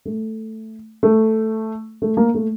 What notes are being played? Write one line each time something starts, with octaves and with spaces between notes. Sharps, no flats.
A3
A3
A3
A#3
A3